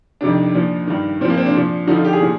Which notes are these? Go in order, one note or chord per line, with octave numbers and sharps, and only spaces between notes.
F2 C3 D#3 D4
A#2 F3
G2 D#3
A#2 F3 C4
A#3
C4
D4
A#2 F3
F2 D3 F3 D#4
F4
G4
G#4
A#2 F3